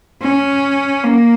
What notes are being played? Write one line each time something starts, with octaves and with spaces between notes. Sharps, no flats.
C#4
A#3